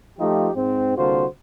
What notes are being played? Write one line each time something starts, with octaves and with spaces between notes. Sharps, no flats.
F3 A3 D#4 F4 G4
G#2 C4
C2 D3 A#3 F4 F#4 C5